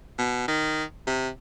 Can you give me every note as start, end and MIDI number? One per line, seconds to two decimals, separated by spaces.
0.18 0.45 47
0.48 0.84 51
1.07 1.28 48